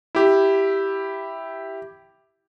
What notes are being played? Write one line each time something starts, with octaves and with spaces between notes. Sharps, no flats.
E4 G4